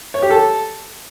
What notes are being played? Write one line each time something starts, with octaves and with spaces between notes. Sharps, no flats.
C#5
G4
A4